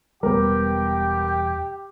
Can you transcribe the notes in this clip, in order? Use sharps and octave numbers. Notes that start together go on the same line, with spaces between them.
E1 G3 B3 G4 A#4 G5